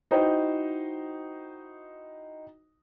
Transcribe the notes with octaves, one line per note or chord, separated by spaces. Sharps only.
D#4 E4 F#4 C5 D#5 G5